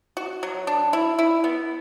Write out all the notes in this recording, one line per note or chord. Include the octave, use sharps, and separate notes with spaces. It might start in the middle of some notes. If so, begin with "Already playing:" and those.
F#4
F#3
D4
E4
E4
B3